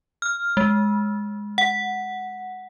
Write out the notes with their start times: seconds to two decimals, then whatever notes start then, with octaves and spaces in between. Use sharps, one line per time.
0.22 F6
0.57 G#3
1.58 F#5